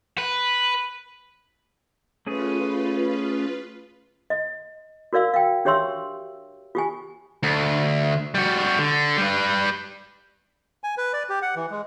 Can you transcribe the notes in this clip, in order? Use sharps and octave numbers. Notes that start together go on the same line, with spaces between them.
B4
A3 C#4 F4 G#4 B4
D#5
F#4 A#4 D5 F5 E6
F5 G5
D4 G4 C#5 E5 C6 E6
F4 G4 G#5
D2
G3 F#4
D3
G3 B4
G#5
B4
D5
G4
F#5
E3
G#3